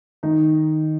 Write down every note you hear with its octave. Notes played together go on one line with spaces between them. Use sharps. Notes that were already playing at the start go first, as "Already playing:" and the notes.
D#3 D#4